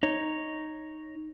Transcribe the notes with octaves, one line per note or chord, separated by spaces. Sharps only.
D#4 C#5